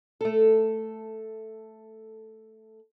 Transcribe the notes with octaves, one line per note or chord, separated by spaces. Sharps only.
A3 A4